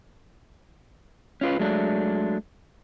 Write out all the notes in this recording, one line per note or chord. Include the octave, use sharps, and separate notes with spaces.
C#4 F4 B4
F#3 G#3 A3 D4